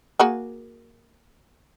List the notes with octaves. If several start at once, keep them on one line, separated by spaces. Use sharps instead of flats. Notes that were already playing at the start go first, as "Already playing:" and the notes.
A#3 F#4 G#4